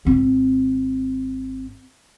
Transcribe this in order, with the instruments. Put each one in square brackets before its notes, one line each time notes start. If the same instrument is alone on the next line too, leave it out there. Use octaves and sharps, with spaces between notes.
[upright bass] G#1 C4